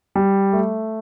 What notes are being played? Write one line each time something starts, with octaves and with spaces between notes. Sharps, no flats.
G3
A3